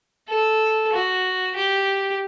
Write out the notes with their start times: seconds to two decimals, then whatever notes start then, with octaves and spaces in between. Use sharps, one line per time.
0.29 A4
0.93 F#4
1.56 G4